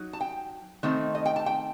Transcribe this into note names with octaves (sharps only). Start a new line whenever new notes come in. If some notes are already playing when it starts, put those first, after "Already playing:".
Already playing: F#3 D#4
A5
G5
D#3 A3 C4 D#4
D#5
G5
A5
G5